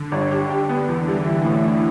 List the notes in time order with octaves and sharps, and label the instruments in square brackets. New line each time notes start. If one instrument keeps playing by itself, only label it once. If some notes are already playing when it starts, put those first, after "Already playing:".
Already playing: [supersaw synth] D3
[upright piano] G1
G4
G4
B3
E2
[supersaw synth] E3 [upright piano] G3
[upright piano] E4
A2
E4